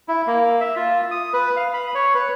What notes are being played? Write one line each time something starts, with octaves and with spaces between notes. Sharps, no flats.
E4
A#3
E5
F4
D#6
B4
F5
B5
C#5
B4